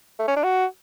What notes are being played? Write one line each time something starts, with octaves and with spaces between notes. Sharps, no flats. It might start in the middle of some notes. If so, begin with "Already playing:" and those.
A3
C#4
D4
F#4